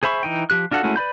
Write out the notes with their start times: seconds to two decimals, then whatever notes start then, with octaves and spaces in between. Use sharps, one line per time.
0.03 G#4 C5 E5 B5 C#6
0.23 E3 D#4 G5
0.50 F3 G4 F#6
0.71 D4 F4 F#4 A4 F#5
0.83 G#3 A3 C#4 E4 F#4
0.96 B4 D5 B5 G6